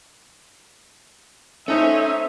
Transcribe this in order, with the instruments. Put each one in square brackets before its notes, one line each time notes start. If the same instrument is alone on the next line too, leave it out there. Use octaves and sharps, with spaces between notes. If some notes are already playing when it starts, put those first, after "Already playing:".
[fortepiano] A3 D#4 C5 [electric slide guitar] C#4 [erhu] E5